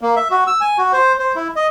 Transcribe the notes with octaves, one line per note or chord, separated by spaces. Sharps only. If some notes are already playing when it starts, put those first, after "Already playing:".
A#3
E5
F#4
E6
G#5
F#4
C5
C5
E4
D#5